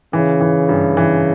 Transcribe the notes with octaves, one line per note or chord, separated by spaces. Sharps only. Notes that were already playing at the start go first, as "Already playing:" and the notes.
C#3 E3
E3
G2
E3